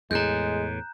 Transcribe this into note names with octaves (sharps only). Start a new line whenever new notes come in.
E2 A2 G#3 A#5 F#6 G6